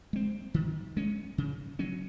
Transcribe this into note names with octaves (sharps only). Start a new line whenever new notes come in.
G#3 C4
D#3
G#3 C#4
C#3
F#3 C#4